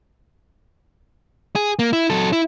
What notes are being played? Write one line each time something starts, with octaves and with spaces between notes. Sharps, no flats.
G#4
A#3
E4
F#3 A4
E4